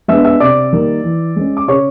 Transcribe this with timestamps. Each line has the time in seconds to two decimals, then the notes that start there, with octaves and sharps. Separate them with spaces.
0.08 G#3 B3 D4 E5 E6
0.25 E5 E6
0.40 C3 D5 D6
0.72 D#3 G3 A#3
1.04 E3
1.36 G#3 C#4
1.57 D6
1.68 C#3 C#5 C#6